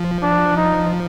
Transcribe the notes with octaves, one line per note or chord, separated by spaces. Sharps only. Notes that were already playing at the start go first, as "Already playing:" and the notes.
Already playing: F3
D4
D#4